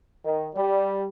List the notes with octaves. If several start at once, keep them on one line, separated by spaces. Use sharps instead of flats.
D#3
G3